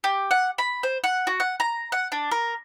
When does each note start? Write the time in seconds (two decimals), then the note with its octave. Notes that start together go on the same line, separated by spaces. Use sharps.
0.04 G4
0.31 F#5
0.58 B5
0.83 C5
1.04 F#5
1.27 F#4
1.40 F#5
1.60 A#5
1.92 F#5
2.12 D4
2.31 A#4